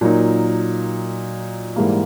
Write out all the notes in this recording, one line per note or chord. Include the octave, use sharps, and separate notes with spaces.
A#2 F#3 A#3 D#4
G#2 E3 G3 A#3